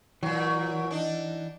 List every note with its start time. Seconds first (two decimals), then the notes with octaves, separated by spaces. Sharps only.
0.23 A#2 E3 F#3
0.91 D4 D#4